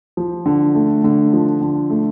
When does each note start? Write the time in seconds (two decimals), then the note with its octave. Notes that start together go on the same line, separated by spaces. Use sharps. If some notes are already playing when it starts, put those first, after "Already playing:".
0.17 F3
0.46 D3
0.75 A3
1.04 D3
1.33 F3
1.61 D3
1.90 A3